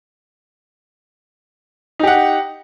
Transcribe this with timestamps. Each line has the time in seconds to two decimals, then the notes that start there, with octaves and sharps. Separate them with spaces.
1.99 D#4
2.03 G4
2.07 F#5